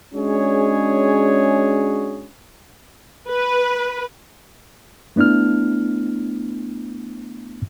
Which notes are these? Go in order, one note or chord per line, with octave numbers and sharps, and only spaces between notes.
G#3 C#4 D4 F#4 G#4 C#5
B4
A3 B3 D4 E4 F6